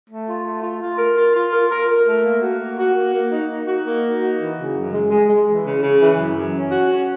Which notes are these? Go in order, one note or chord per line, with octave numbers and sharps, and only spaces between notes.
A3
F4
A3
F4
F4
A#4
F4
F4
A#4
A#4
A#4
A3
A#3
F#4
A#3
F#4
A#3
A#3
D#4
D#4
F#4
A#3
D#4
F#4
E3
C#3
F#2
G#3
G#3
G#3
E3
C#3
C#3
E3
F#2
F#2
C#4
F#4
C#4